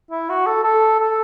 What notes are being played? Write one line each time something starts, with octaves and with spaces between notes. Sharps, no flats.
E4
F#4
A4
A4
A4